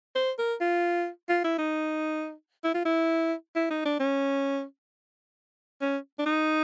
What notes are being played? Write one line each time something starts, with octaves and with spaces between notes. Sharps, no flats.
C5
A#4
F4
F4
E4
D#4
E4
F4
E4
E4
D#4
D4
C#4
C#4
D4
D#4